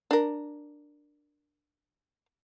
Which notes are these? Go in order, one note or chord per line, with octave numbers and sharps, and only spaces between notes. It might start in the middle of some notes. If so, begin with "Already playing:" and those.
D4 A#4